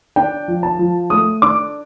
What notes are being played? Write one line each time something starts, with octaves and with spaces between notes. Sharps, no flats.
D4 G5
F3
A5
F3
A3 D#6
D4 D6